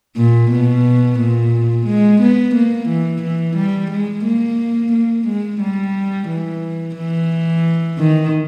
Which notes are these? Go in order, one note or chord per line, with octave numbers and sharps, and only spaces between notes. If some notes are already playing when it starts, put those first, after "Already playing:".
A#2
B2
A#2
G#3
B3
A#3
E3
E3
G3
G#3
A#3
A#3
G#3
G3
E3
E3
D#3